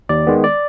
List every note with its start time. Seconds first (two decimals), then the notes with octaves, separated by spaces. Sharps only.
0.09 D#2 D5
0.27 D#3 G#3 B3
0.44 D5